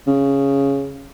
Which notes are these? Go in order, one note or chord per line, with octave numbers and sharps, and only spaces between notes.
C#3